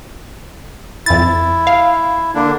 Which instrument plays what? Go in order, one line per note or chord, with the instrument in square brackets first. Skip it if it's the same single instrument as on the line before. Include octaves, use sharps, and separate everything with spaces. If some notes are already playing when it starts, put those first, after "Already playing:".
[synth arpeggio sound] F2 A6 [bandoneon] E4
[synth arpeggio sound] F5
[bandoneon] D3 A#3 D4